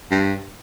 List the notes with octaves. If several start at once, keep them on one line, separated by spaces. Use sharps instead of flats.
G2